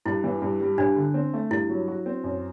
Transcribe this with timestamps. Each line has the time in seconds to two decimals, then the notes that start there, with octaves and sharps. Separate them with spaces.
0.06 G2 E4
0.24 E3
0.42 G2
0.61 G3
0.78 G2 D4
0.96 D3
1.14 C4
1.34 A3
1.51 G2 E4
1.69 F#3
1.88 F#4
2.06 C4
2.24 F#2